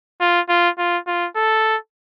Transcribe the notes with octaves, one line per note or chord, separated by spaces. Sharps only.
F4
F4
F4
F4
A4